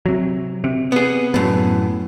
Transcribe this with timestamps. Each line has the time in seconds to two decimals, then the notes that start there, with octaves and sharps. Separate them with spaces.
0.06 C3 F#3
0.64 C3
0.92 B3 G#4
1.34 F#2 A2 B3